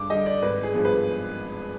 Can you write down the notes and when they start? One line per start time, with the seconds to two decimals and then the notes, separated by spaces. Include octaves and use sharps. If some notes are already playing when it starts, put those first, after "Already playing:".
Already playing: G2 D6
0.10 D3 G3 D#5
0.26 D5
0.42 G#1 B4
0.63 G#4
0.74 G2 F3 G#3 B3
0.85 B4